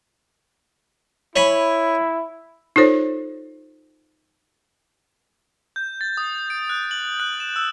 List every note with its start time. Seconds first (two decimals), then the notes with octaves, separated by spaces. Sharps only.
1.36 E4 C#5 G#5 B5
2.76 D#4 F4 A4 C5 C#5
5.76 G6
6.01 A6
6.17 D#6
6.50 D7
6.69 F#6
6.91 F#7
7.20 F#6
7.40 E7
7.56 E6